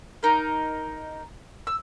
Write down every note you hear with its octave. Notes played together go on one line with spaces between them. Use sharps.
D#4 A#4
E6